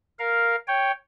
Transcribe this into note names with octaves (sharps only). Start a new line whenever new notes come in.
A#4 F5
C#5 G5